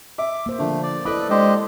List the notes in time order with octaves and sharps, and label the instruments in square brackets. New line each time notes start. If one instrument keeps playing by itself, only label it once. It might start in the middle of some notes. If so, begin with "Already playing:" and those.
[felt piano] E5 [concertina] D6
[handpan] A#3 C5
[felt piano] D3 F3 [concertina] A3
[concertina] D5
[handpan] E4 A4 D5 [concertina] B4 D#5 B5 [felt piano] D6
[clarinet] G#3 [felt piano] D4 [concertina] G4 C5 D#5